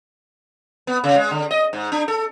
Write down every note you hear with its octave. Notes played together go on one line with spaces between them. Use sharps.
B3
C#3
G#3
D3
D#5
G#2
D4
A4